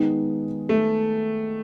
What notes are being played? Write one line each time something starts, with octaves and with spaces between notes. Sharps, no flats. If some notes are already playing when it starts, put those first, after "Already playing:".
Already playing: D#3 G#3 B3 D#4
A3